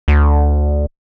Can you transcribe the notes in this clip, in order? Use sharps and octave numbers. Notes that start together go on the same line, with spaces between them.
D2